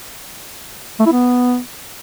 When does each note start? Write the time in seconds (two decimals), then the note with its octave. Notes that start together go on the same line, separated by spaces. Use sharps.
1.00 A3
1.06 E4
1.12 B3